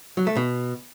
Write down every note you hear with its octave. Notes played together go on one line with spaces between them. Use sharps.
F#3
A3
B2